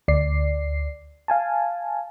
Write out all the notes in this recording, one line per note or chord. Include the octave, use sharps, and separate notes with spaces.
D2 D5 C7
F5 G#5 A5